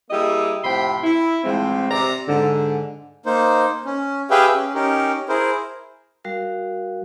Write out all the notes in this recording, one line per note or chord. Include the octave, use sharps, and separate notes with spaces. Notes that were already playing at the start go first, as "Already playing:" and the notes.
G3 A#3 E4 G4 G#4 D#5
A2 C3 F3 G5 B5 C6
E4
A2 E3 F3 G#3 C4
C3 D5 A#5
G#2 D3
A#3 D#4 C5
C#4
G4 G#4 B4 E5 F5 G5
C#4
C#4 D#4 G4 A#4
E4 G#4 A#4 C5
G3 F#4 A#4 F5